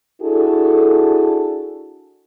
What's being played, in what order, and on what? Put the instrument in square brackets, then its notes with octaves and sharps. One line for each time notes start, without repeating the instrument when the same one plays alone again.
[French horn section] D4 E4 F#4 G#4 A4